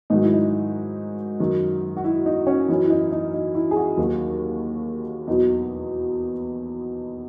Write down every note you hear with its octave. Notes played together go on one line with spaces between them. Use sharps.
G#2 D#3 F#3 D#4
E4
D#4
F#2 D#3 F#3
F#4
E4
D#4
C#4
F#2 E3 D#4
E4
D#4
D#4
D#4
E4
G#4
F#4
D#2 D#3 F#3
E2 B2 F#3 D#4